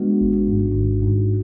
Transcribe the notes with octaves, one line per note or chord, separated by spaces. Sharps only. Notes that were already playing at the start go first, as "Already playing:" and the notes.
Already playing: G#3 B3 D4 F#4
G#1
G#2
G#1
G#2